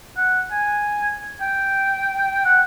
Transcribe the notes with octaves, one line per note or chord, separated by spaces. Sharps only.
F#5
G#5
G5
F#5